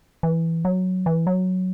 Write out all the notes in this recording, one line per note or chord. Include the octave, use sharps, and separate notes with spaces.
E3
F#3
E3
F#3